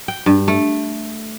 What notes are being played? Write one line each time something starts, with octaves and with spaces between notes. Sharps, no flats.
G5
G2
A3